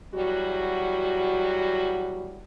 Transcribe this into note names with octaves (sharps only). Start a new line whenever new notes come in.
E2 F#3 G3 F#4